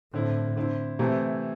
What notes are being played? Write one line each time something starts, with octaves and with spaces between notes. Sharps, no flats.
A2 D3 C4 E4
D3 C4 E4
C3 E3 A3 C4 E4